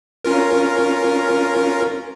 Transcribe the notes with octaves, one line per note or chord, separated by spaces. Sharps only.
C#4 F4 A#4